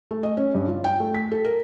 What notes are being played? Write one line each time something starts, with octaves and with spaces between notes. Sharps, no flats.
A3
D#5
C#4
G2
F4
G5
A3
B6
A4
A#4